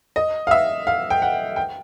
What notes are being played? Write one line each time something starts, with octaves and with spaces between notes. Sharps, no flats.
D#5
F5
E5
F5
G5
F#5
G5